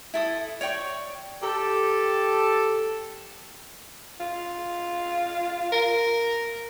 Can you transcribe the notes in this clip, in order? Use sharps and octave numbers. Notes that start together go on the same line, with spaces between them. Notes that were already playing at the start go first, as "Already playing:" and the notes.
E4 A4 D#6
C#5 D5 G5 C#6
G4 A4
F4
A#4